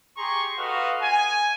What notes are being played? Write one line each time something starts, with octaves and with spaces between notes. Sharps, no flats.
G4 G#4 A#5 C6 C#6
F#4 A4 B4 D#5 F5
G#5